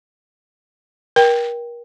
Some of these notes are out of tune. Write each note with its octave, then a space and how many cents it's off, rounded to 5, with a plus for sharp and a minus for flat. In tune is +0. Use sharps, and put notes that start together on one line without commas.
A#4 +35 G5 +0